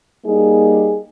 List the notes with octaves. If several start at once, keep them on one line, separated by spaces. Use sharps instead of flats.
G3 A#3 D#4 G#4